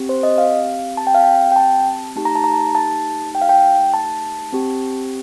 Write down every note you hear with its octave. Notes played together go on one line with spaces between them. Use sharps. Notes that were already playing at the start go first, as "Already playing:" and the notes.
Already playing: C4 G4
C5
D#5
F5
A5
G5
F5
G5
G5
A5
A3 D#4 G4 A5
A#5
A5
A#5
A5
A5
G5
F5
G5
A5
C4 G4